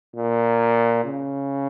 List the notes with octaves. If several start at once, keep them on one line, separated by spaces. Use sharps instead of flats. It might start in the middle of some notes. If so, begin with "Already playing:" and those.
A#2
C#3